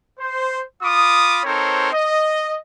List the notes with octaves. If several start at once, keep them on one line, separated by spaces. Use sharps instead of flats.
C5
F4 B5 D6 D#6
C4 D#4 A4 A#4 C5 C#5
D#5